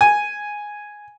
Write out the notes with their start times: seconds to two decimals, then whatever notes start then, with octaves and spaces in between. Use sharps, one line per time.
0.01 G#5